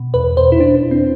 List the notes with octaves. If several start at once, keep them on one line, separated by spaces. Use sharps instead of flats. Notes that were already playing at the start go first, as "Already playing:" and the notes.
Already playing: B2
E2 B4
B2 C5
E4
B2 D4
E2
C4